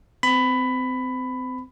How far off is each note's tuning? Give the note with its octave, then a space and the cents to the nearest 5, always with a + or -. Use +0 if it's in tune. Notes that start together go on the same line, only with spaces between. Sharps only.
C4 -30 B5 +15